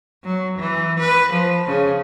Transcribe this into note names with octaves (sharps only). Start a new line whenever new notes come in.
F#3
E3
B4
F3
C#3